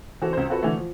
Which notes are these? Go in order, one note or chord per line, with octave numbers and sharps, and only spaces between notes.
E3 C4 F#4 A4
C#2 C5
C4 F4 F#4 A4 B4
D3 E3 A3
F3